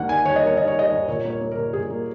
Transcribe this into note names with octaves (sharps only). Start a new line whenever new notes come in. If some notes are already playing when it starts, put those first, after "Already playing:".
Already playing: D#2 A#3 F#5
D#3 G#5
D#2 C#5
D#5
A#3
C#5
D#2 D#5
C#5
D#3 D#5
D#2 C#5
A#2 C#5
A#3
C#5
A#3
A#4
A#2
A#2 G#4
A#3